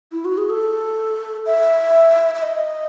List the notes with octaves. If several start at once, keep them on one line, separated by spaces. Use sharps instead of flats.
E4
F#4
G#4
A4
E5
E5
D#5